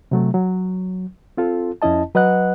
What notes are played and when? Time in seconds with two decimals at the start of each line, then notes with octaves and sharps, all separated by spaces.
0.11 C3 F#3 A3
0.34 F#3
1.37 C4 F4 A4
1.82 F2 C#4 E4 D#5 A5
2.15 F#3 B4 D#5 F#5 F#6